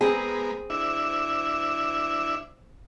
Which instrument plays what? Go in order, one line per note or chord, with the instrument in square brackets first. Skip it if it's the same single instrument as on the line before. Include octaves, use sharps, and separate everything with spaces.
[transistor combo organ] G#3 B3 A#4 [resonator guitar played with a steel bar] C4 G#4
[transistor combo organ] D4 E4 E5